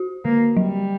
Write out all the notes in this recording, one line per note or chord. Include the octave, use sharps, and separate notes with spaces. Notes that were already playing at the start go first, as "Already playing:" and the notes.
Already playing: F#4
D3 A#3
F#3 G3